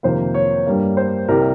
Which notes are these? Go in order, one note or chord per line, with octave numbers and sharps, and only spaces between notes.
F2 C3 D#3 A#3 C5
C#5
G2 G3 A#3
C5
C2 C3 G3 A#4